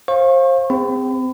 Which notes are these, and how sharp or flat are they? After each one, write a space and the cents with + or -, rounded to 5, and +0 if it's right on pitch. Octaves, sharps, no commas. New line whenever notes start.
C5 +30 F5 +0 C#6 -30
C4 -25 G#4 -40 B5 +35